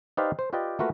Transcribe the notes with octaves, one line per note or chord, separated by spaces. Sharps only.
D#4 G4 B4 C5 D5 F5
C5
F4 G4 B4 D5 D#5 G5
A3 A#3 F4 F#4 A#4 B4